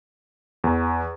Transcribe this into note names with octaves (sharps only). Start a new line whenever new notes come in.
E2